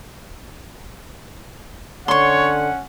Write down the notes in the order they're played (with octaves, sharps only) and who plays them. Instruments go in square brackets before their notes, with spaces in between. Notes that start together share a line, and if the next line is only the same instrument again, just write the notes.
[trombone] D3 [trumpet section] C#4 F#5 [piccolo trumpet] C#5 [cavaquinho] C6 C#6